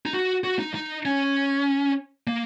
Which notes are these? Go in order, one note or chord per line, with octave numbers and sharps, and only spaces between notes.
D#4
F#4
F#4
D#4
D#4
C#4
A#3